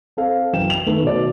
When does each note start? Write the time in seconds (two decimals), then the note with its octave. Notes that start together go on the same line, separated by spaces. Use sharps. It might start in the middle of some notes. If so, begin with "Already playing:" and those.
0.17 C4 A4 F5
0.53 F#2 E3 G5 E7
0.70 F7 F#7
0.86 D#3 A3 B3
1.02 B2 D#3 D5